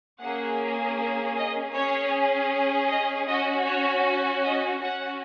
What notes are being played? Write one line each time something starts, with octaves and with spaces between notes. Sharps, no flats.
A#3 C#4 G#4 F#5
D#5
C#4 G#4 C#5
D#5
C#4 F#4 D#5
C#5
D#5
C#4 F#4 F#5